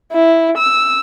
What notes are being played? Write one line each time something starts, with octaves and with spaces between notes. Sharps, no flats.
E4
E6